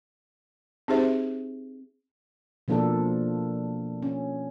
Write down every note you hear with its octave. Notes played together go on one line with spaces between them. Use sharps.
C4 D#4 G4 G#4 C5 E5
B2 F3 A#3 D4 F4 A4
C#4